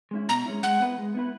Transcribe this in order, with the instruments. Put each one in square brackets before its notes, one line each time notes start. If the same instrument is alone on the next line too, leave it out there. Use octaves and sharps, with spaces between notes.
[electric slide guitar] G#3 C#4 E4
[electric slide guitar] B2 [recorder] A#5
[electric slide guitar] G#3 C#4 E4
[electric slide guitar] G#3 [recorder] F#5
[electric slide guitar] B3 E4 B4
G#3
B3 E4 B4